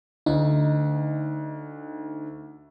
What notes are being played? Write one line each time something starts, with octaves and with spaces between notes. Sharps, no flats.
D2 D#4